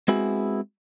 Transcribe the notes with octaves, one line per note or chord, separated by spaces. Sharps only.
G#3 B3 C4 E4 F#4 G#4